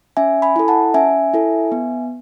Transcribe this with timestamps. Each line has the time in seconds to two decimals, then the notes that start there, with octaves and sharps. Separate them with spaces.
0.17 C#4 E5 G#5
0.42 G#5 B5
0.56 E4 A4
0.68 F#5 A5
0.94 C#4 E5 G#5
1.34 E4 A4
1.72 B3